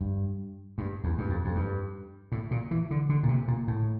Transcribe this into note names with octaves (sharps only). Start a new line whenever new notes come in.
G2
G2
E2
G2
F2
F2
G2
A2
A#2
E3
D3
D3
A#2
C3
A#2
A2